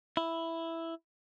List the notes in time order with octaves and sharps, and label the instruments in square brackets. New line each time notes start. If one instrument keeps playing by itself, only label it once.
[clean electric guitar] E4